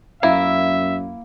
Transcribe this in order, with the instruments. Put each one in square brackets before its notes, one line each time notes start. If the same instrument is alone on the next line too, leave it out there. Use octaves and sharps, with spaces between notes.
[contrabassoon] F#2 [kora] A#3 [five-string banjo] E4 [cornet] E5